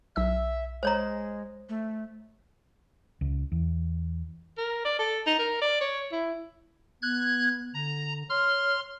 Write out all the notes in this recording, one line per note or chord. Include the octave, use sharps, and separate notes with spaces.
B1 E5 E6
G#3 C5 C#5 A#5
A3
C#2
E2
A#4
D5
A4
D#4
A#4
D5
C#5
E4
B3 F#6 G#6
D3 A#5
C#5 C6 F6